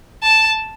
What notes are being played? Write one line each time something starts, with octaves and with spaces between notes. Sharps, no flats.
A5